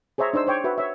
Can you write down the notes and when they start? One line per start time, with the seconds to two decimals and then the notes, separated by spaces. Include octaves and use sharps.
0.18 G#4 C5 C#5 E5 A#5
0.33 D4 D#4 C5 E6
0.47 C5 C#5 G5 D6
0.64 F#4 B4 E5
0.78 C#5 E5